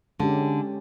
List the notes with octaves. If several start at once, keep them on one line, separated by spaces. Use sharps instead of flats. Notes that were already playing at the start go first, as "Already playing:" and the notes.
D3 G#3 C#4 G4